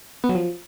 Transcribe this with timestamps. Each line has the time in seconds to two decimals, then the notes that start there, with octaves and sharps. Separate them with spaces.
0.24 B3
0.29 F#3
0.35 F3